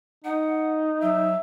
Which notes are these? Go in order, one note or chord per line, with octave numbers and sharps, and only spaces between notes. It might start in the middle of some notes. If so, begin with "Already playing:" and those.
D#4 F#5
F#3 E5